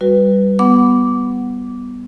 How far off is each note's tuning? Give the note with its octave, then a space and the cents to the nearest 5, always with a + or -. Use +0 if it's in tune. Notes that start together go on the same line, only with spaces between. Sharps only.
G3 +0 F#4 +0 B4 +0
B3 -5 F#5 +0 D6 -10